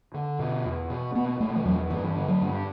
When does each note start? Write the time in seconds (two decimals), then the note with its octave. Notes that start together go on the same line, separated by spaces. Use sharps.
0.14 D3
0.39 B2
0.65 E2
0.90 B2
1.15 B2 B3
1.40 B2 A3
1.56 E3
1.65 E2 F#3
1.90 G2 E3
2.16 D3
2.28 F#3
2.41 G2